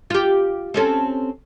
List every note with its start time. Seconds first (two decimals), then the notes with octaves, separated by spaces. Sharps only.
0.10 F4 G4
0.74 C4 C#4 A4